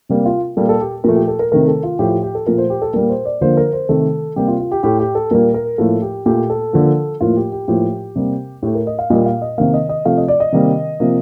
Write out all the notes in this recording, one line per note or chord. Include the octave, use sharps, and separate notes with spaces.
C3 G3 A#3
F4
A#2 G3 A#3 A4
A4
G4
A#2 F3 A3 A#4
G4
A4
A#4
C3 D#3 A3 A#4
A4
F4
A2 F3 A3 G4
G4
G4
A4
A#2 F3 A3 A#4
C5
G4
A4
A#2 G3 A#3 A#4
C5
D5
D3 F3 A#3 C5
A#4
C5
C3 D#3 A3 A4
C3 G3 A#3 G4
F4
F4
G4
A2 A3 G4
G4
A4
A#2 G3 A#3 A#4
A#4
A2 F3 A#3 A4
G4
A#2 A3 G4
A4
D3 F3 A#3
A2 F3 A#3 F4
G4
G4
A2 F3 A#3 G4
C3 G3 A#3
A2 A3 G4
A#4
D#5
F5
A#2 G3 A#3 D#5
F5
D#5
C3 D#3 A#3 F5
D#5
D#5
C3 F3 A3 F5
D#5
D5
D#5
C3 D#3 G3 A#3
C3 F3 A#3